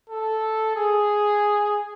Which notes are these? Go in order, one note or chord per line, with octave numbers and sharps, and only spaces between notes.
A4
G#4